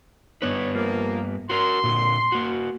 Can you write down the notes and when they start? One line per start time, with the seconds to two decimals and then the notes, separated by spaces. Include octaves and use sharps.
0.42 G2 B3 D4 D#4 B4 C#5
0.75 F3 A#3
1.50 F#4 A#4 C6
1.84 A#2 D3
2.32 A#3 F#4